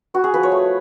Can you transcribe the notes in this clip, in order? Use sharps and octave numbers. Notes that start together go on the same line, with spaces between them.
B3 F#4
G#4
F3 B4
C#5
A3